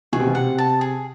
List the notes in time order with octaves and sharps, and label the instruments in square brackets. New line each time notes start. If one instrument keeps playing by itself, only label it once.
[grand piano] B2 [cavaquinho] G#4
[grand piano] C3
B2
[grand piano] C3 [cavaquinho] F#5
[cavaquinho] A5
G#4